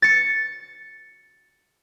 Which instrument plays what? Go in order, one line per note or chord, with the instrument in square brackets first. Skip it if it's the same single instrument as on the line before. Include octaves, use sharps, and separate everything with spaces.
[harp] A6 C#7